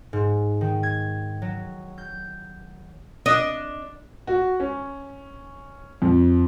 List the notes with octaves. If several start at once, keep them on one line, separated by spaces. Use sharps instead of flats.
G#2
D#3
G#6
F#3
G6
D4 D#5
F#4
C#4
F2